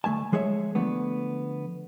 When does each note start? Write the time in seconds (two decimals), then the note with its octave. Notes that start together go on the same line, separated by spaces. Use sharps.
0.04 D2 F3 A3 G#5 A5
0.32 F3 G#3 G#4 C#5 D5 E5
0.75 D3 F3 A3 B3